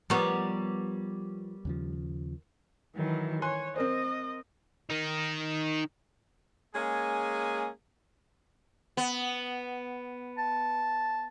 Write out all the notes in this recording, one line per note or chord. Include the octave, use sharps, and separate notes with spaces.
F3 G3 B3 A#4 C#5 D6
D#2 C#3 F3
D#3 E3 F#3
C#5 G#5 C6 F#6
C4 A#4 C5 D#5
D#3 D#4
G#3 A#3 C#4 G#4
B3
A5